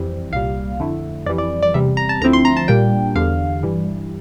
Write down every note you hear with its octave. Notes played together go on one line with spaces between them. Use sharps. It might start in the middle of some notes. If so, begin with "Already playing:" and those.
Already playing: F2 E3 G3 C4
C2 A#2 G3 F5
F2 D3 A3 E4
F2 E3 G3 D5
D5
D5
E2 C3 G3 E5
A#5
A5
D2 D3 F3 C4 E4 A#5
C6
A#5
A5
A#2 G3 A#3 D4 G5
E2 D3 G3 F5
G2 E3 G3